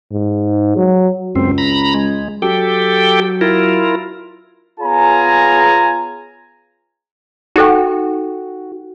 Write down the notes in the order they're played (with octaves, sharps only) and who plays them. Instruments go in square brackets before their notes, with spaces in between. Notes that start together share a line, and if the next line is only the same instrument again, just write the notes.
[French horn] G#2
F#3
[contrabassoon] C#2 [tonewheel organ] F#2 C4
[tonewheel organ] A#5 B5
G#3
[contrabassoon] F#3 [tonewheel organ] G4 A4 G5
[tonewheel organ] E4 F4 A#4
[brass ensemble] B3 F4 G#4 C#5 G#5 A#5
[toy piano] D#4 A4 G5 [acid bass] F#4